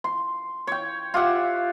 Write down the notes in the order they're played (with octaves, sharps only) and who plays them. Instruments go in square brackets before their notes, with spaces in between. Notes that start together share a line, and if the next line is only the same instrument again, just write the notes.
[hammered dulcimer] C6
C#5 G5
F4 G4 E5 F#5